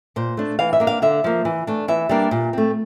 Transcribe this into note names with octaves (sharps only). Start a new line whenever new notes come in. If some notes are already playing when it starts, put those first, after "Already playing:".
A#2 C5
A3 D4
E3 F5
E5
A#3 D4
F5
D3 E5
F3 A#3
E3
A3 D4
E3 E5
G3 A#3 D4
A#2
A3 C4